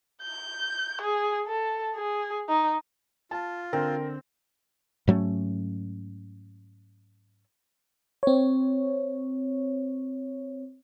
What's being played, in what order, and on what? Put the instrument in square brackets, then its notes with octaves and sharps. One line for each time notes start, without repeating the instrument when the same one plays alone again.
[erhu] G6
G#4
A4
G#4
D#4
[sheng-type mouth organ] F4 [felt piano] A5
[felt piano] D3 [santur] C4 [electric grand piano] A#4
[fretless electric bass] G#2 F#3 A3 C#4
[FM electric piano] C4 C#5